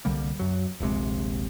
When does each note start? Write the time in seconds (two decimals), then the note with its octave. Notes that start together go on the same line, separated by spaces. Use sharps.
0.05 C2 D3 G3 A#3
0.40 F#2 F#3
0.80 D#1 A#1 C3 G#3